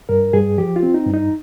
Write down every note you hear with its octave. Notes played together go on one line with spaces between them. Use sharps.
G2 A#4
G2 G#4
F3 G4
F4
C4
D#4
G2
D#4